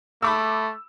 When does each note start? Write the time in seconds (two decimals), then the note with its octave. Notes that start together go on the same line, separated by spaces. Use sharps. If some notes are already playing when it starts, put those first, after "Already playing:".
0.22 A3 B5 D6 E6